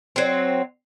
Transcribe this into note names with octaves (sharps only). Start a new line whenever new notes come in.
F#3 C4